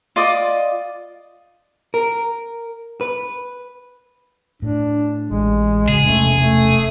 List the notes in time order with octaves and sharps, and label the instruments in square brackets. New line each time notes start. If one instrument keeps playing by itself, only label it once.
[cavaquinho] F4 D5 D#5 D6
[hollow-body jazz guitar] A#4
B4
[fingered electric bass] A2 [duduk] D4
[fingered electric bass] A1 [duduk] G#3
[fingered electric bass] F2 C#3 [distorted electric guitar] G#4
[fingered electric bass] E1 C3 C#4 [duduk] A3
[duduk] A3